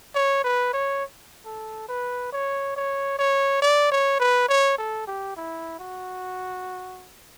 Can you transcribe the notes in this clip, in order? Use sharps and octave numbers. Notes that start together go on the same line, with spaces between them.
C#5
B4
C#5
A4
B4
C#5
C#5
C#5
D5
C#5
B4
C#5
A4
G4
E4
F#4